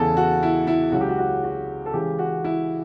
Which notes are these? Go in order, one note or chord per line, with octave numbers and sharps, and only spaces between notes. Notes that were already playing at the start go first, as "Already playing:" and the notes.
Already playing: E2 C#3 E3 A4
F#4
E4
E4
C#2 C#3 F#3 F#4
G4
F#4
F#4
F#4
A4
C#2 C#3 E3 G4
F#4
E4